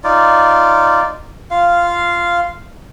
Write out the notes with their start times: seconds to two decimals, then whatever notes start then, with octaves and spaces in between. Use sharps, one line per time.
0.04 D#4 F4 D5
1.51 F4 F5